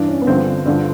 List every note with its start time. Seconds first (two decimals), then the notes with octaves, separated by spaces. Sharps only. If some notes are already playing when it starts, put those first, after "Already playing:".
Already playing: G2 E3 D4
0.09 C#4
0.22 B3
0.27 G2 D3 F3 C4
0.66 G2 D3 F3